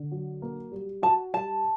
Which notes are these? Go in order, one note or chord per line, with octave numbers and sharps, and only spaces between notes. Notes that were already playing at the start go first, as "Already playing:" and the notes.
Already playing: D3
F#3
A#3
G3
F#4 A5
G3 A5